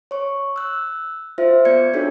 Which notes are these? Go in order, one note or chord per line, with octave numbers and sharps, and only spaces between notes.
C#5 C#6
E6 F#6
F4 C5 E5
B3 F4 D5 G#6 C#7
D4 D#4 F#4 A4 C#5